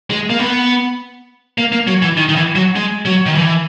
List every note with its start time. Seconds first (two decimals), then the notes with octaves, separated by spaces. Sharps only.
0.10 G#3
0.30 A#3
0.39 B3
1.58 A#3
1.72 A#3
1.87 F#3
2.02 E3
2.17 D#3
2.29 D#3
2.36 E3
2.55 F#3
2.76 G#3
3.05 F#3
3.26 D#3
3.35 E3